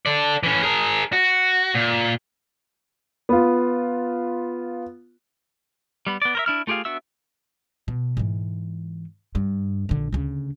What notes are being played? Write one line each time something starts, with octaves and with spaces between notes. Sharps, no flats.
A4 D5
E3 C#4
G#4 A#4
F#4
A#2
B3 F4
G3 B3 B5
B3 D5
A#4 C5 E5
D4 E4 F6
A3 F4 G4 G#4 F5
B3 D4 F#4 E5 E6
B2
G#2 E3
G2
A#1 D3
D2 C#3